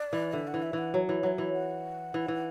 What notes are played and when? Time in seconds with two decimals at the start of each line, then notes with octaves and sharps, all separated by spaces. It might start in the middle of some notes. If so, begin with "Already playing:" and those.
Already playing: D5
0.13 E3
0.33 D3 E5
0.48 F#5
0.54 E3
0.63 E5
0.73 E3 F#5
0.94 F#3
1.09 E3
1.23 F#3 E5 F#5
1.38 E3
1.53 F#5
2.14 E3
2.28 E3